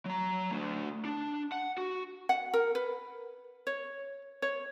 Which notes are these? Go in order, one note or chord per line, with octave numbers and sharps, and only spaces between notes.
F#3 A#5
A3 D4
D4
F#5
F#4
F#5
A#4
B4
C#5
C#5